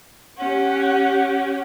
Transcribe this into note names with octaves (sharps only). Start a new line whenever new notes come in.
C#4 G4 F#5